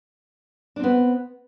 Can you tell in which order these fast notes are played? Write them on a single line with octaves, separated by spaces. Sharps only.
D4 C4 B3